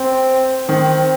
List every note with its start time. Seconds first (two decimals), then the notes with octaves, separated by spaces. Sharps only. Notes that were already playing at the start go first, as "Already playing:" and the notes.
Already playing: C4
0.69 D#3 C4